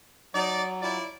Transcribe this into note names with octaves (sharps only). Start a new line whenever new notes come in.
F#3 D#4 D5
E4 F4 D5